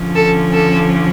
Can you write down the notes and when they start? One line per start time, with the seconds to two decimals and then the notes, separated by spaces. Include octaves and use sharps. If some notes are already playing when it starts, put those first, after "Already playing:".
Already playing: D3 F3 C#4
0.14 A4
0.52 A4